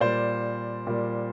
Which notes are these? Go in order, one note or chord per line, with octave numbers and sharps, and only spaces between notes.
A#2 G3 C5 D5
A#2 G3